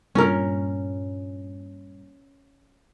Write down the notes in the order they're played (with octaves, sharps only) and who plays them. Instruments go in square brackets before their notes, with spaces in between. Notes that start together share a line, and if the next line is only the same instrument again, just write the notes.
[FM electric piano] G2 A#2 [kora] C#4 A#4